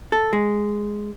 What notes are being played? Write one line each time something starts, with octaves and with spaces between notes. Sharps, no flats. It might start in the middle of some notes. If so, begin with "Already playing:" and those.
A4
G#3